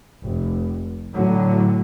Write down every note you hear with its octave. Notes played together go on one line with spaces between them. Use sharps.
F1
A2 D3 F#3